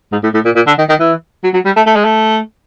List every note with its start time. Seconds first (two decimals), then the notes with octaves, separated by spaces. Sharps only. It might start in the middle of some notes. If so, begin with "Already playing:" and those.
0.12 G#2
0.23 A2
0.34 A2
0.45 A#2
0.56 A#2
0.67 D3
0.78 D#3
0.89 D#3
1.00 E3
1.43 F#3
1.54 F#3
1.65 G3
1.76 A3
1.87 A3
1.96 G#3
2.05 A3